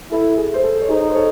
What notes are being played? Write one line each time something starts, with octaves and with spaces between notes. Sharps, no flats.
E4 A4
G#4
C5
A4
C#5
D#4 G#4 C5
C5
A4 C#5